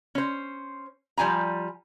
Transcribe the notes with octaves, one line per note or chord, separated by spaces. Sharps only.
C#4 C5
F3 G3 G#5 A#5